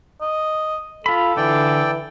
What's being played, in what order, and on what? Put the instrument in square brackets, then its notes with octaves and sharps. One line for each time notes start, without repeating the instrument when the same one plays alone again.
[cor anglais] D#5
[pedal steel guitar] F4 B5 [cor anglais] A4
[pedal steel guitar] D3 [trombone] E3 [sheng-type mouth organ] D5 G5